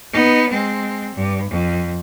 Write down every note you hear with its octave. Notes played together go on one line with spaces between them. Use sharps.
B3 D#4
G#3 C4
G2
F2